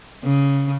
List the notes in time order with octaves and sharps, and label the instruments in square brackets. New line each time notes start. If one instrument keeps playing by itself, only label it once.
[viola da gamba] C#3